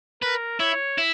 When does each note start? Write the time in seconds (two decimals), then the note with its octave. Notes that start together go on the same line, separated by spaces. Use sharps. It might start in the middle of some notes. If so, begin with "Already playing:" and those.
0.22 A#4 B4
0.60 E4 C#5
0.98 E4